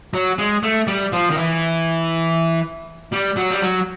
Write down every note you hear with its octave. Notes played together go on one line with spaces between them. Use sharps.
F#3
G#3
A3
G3
F3
D#3
E3
G3
F#3
G3
F#3